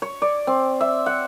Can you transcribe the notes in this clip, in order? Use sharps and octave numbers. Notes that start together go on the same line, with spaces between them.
C#5
D5
C4
E5
F#5